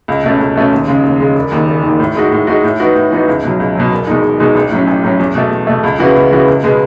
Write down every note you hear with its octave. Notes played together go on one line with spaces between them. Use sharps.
C#2
B2 A3 C#4
C#2
B2 A3 C#4
D#2
C#3 G#3
D#2
C#3 G#3
E1
D#2 D#3
E1
D#2 D#3
A2
G#3 D#4 F#4
A2
G#3 D#4 F#4
A2
E3 B3 D#4 F#4
A2
E3 B3 D#4 F#4
C#2
B2 F#3
C#2
B2 F#3
E1
E2 B2 G#3 D#4
E1
E2 B2 G#3 D#4
A1
A2 F#3 C#4
A1
A2 F#3 C#4
E2
B2 A3
E2
B2 A3
C#2
C#3 E3 B3 F#4
C#2
C#3 E3 B3 F#4
C#2
B2 G#3 B3